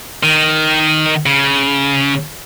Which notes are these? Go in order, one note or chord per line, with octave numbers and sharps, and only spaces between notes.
D#3
C#3